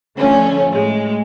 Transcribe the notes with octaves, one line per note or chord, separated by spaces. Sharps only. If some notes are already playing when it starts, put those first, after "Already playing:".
D3 F3 A3 C#4
A2 G#3